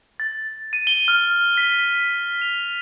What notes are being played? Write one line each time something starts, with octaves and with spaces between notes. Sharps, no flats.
A6
D#7
G7
F6
B6
F7